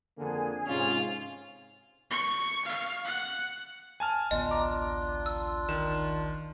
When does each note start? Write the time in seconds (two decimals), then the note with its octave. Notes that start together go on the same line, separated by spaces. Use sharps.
0.18 F2 D3 A#3 G#4 G#5
0.67 G#2 C3 C#4 F4 F7
2.11 C#6
2.65 F5
3.05 F#5
4.00 G#5 A5 F6
4.31 A1 D2 B3 D4 F4 D#5
4.51 A#5 D6
5.26 E6
5.69 D#3 E7